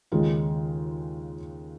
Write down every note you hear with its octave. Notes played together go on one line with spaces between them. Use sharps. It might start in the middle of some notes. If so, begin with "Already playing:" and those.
D#2 C#3 G#3 F4 G#4